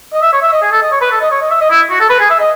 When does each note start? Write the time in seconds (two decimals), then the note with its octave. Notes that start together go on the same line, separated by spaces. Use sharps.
0.13 D#5
0.22 E5
0.33 C#5
0.42 E5
0.52 D#5
0.62 G#4
0.72 A4
0.82 D#5
0.91 C#5
1.01 B4
1.11 A4
1.21 D#5
1.31 C#5
1.41 D#5
1.50 E5
1.61 D#5
1.70 E4
1.90 F#4
2.00 A4
2.10 B4
2.20 G#4
2.30 E5
2.40 D#5